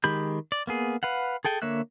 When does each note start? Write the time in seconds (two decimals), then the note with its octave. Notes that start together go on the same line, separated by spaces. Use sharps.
0.04 D#3 G#3 G4 B5 G6
0.52 D5
0.67 A#3 B3 G#4
1.03 B4 F5 F#5
1.45 G#4 A4 G5 G#5
1.62 D3 A#3 C#5 E5 F#6